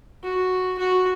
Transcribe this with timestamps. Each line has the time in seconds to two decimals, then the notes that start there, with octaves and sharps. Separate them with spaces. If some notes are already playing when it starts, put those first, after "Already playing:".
0.23 F#4
0.79 F#4